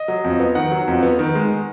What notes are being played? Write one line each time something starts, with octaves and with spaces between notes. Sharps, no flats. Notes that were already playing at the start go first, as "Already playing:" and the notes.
Already playing: D#5
F#3
F2
B3
D#3 F#5
F#3
F2
B3
D#3
G#3